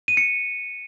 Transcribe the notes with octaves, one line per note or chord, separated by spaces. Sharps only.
D#7
C#7